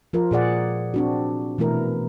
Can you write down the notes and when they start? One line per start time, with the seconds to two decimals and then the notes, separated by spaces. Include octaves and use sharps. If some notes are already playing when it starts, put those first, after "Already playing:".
0.13 F3 F4 A#4
0.31 A#2 G#4 D5 F#5
0.94 C4 D4 F#4
1.58 B2 E3 A3 E4 A#4